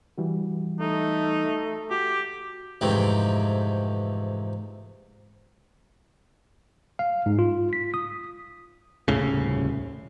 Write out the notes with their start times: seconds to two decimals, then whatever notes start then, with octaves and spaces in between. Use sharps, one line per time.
0.18 E3 G3 F#4
0.80 A3 D#4
1.91 F#4 G4
2.81 F2 G#2 C3 E3 A3 G5
6.99 F5
7.26 G#2
7.39 F4
7.73 B6
7.94 D#6
9.08 D#1 C2 A2 C#3